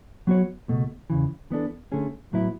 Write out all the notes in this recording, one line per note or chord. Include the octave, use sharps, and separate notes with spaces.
F#3 B3 F#4 C#5
C#2 B2 A3
E2 C#3 E3
E3 B3 D4 A4
D3 A3 C#4 G#4
A2 F#3 B3 E4